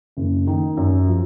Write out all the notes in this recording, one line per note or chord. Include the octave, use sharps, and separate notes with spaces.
F#1
D#3
F#2
F3